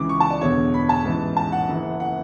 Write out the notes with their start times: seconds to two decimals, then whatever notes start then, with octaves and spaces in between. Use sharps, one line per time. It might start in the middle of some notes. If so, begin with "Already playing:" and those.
Already playing: C#2 C#3 E3 D6
0.09 C#6
0.20 A5
0.30 D5
0.41 E1 E2 D3 C#5
0.74 B5
0.89 A5
1.05 A1 G#2 E3
1.37 A5
1.52 F#5
1.69 F#1 F#2 E3
2.00 F#5